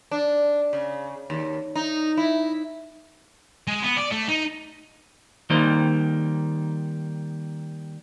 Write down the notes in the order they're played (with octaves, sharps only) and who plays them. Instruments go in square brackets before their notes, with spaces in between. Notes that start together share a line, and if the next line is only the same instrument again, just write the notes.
[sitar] D4
C#3
D#2
D#4
E4
[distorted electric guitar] G#3
B3
D5
A3
D#4
[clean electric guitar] D#3 G3 A#3 D#4 C5